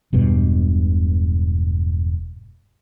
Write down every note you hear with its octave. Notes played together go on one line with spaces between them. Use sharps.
E1 G2 B2